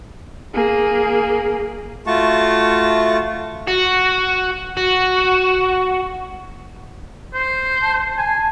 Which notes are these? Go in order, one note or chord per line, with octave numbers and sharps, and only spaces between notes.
A#3 G#4
A3 F4 F#4 A5 C#6
F#4
F#4
C5
A5
G#5